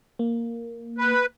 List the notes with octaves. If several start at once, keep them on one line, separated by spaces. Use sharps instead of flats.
A#3
B4